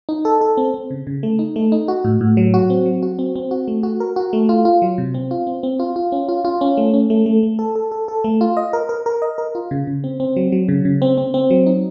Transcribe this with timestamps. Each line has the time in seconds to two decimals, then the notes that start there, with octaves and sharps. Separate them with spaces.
0.09 D#4
0.25 A4
0.41 A4
0.57 C4
0.74 C4
0.91 C#3
1.07 C#3
1.23 A3
1.39 D#4
1.56 A3
1.72 D#4
1.88 F#4
2.05 A2
2.21 A2
2.37 F#3
2.54 F#4
2.70 C4
2.86 F#3
3.03 F#4
3.19 C4
3.36 C4
3.51 F#4
3.68 A3
3.83 F#4
4.00 A#4
4.16 F#4
4.33 A3
4.49 F4
4.65 F4
4.82 F#3
4.98 C3
5.14 C4
5.31 F4
5.47 C4
5.63 C4
5.79 F4
5.96 F4
6.12 C#4
6.29 F4
6.45 F4
6.61 C#4
6.77 A3
6.94 C#4
7.10 A3
7.26 A3
7.43 A3
7.59 A4
7.75 A4
7.92 A4
8.08 A4
8.24 A3
8.41 F4
8.57 D#5
8.73 A#4
8.89 A#4
9.06 A#4
9.22 D#5
9.38 A#4
9.55 F4
9.71 C#3
9.87 C#3
10.04 C4
10.20 C4
10.36 F#3
10.52 F#3
10.69 C#3
10.85 C#3
11.02 C4
11.18 C4
11.34 C4
11.51 F#3
11.66 D#4